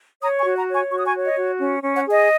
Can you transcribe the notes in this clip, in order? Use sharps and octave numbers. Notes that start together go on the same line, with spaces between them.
C#5 A#5 D#6
G#5 C#6
F#4
F#5 A#5
C#5
G#5 C#6
F#4 C#6
D#6
G#5 C#6
C#5
D#5
F#4
C#4
C#4
C#5 F#5
G#4
D#5